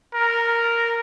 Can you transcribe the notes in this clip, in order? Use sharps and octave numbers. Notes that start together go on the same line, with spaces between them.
A#4